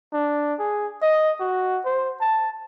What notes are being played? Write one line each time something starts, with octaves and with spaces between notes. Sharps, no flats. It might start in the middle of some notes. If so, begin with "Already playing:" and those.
D4
G#4
D#5
F#4
C5
A5